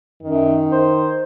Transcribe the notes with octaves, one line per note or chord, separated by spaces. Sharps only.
F#2 D#3
C5